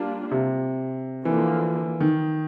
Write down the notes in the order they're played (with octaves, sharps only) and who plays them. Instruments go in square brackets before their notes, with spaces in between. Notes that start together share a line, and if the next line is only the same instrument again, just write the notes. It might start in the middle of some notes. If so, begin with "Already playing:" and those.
Already playing: [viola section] G3 A#3 D4 F4
[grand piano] C3
[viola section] D3 F3 A#3 [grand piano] E3
[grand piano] D#3